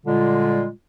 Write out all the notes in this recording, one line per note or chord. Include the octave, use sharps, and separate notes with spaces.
A#2 D3 G3 G#3 F4